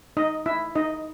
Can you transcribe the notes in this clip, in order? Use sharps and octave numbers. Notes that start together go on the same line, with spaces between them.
D#4 D#5
E4 E5
D#4 D#5